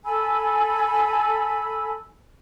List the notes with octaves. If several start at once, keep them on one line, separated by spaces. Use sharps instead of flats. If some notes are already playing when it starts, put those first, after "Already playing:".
A4 G#5 B5 E6